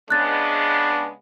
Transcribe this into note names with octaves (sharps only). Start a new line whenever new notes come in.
C#3 G#3 B3 D4 F#6 A6